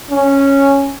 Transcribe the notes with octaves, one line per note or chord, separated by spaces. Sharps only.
C#4